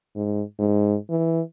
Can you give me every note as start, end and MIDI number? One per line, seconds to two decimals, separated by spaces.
0.15 0.42 44
0.59 0.97 44
1.10 1.41 52